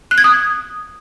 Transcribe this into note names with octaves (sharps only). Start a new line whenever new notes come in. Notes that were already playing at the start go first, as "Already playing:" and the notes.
F#6
G#6
D#6